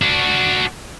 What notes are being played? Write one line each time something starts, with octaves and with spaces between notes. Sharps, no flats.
D4 F#4